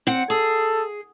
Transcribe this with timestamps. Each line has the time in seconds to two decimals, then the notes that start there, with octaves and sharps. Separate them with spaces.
0.07 C4 F#5
0.30 G#4 A4